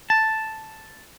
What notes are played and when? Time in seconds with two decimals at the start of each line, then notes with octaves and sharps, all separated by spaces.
0.10 A5